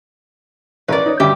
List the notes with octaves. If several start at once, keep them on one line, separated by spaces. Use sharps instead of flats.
A1 A#4 B4 D5
D#4 C#5
D2 G2 G4 E5